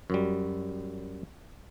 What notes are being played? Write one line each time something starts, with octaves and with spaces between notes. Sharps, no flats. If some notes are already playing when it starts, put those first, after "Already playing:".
F#2 F#3 G3